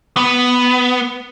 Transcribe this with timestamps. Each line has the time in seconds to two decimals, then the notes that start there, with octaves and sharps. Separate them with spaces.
0.17 B3